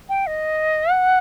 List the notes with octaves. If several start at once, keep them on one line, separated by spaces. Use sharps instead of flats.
G5
D#5
F#5